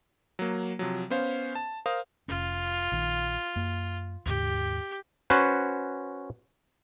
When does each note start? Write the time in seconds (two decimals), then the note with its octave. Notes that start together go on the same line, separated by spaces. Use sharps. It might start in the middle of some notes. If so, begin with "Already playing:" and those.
0.39 F#3 A#3
0.79 C3 F3 F#3
1.10 B3 C#4 C5 F5
1.55 A5
1.86 A#4 C5 F5 D#6
2.28 F1 C#4 F4
2.92 A#1 D#3
3.56 F#2 A#3
4.26 D#2 G#2 C#3 G4
5.30 C#4 F#4 B4 C5